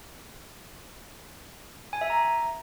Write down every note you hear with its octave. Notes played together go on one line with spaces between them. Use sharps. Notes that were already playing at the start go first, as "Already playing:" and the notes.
G#5
E5
A#5